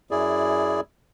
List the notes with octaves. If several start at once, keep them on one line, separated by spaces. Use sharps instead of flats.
F#2 E4 G#4 D5